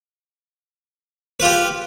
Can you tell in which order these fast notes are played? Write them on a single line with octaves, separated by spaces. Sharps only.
B4 F4 G4